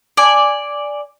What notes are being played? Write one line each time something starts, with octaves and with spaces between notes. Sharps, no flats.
D5 G#5